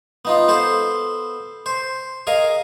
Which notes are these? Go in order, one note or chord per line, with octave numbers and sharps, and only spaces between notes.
B3 D#4 F4
B3 A4 C5
C5
G#4 A#4 D#5 F5